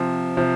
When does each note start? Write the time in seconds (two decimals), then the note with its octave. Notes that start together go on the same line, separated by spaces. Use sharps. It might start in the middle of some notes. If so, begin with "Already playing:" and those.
Already playing: C3 F3
0.37 C3 F3